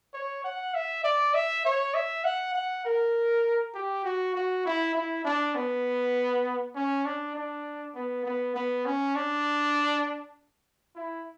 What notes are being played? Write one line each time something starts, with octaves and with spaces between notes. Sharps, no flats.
C#5
F#5
E5
D5
E5
C#5
E5
F#5
F#5
A#4
G4
F#4
F#4
E4
E4
D4
B3
C#4
D4
D4
B3
B3
B3
C#4
D4
E4